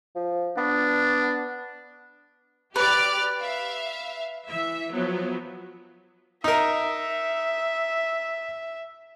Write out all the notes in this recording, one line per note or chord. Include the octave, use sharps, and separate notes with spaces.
F3
B3 D4
G4 B4 D5 F6
E5 F5
E3 E5
F3 F#3 B3
D#4 A#4 E5